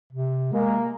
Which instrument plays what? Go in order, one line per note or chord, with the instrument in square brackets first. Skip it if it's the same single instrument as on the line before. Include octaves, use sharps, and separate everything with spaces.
[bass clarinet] C3
[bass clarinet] G#3 [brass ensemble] A#3